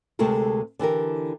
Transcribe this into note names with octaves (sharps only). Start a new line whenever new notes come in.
D2 C3 G#3 A3 A4 A#4
D3 E3 G4 A#4